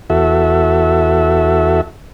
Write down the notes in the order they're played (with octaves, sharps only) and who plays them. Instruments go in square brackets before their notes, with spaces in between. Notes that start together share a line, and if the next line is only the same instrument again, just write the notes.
[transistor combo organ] E2 F#4 A4 E5